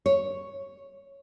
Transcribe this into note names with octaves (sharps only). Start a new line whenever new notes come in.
C#5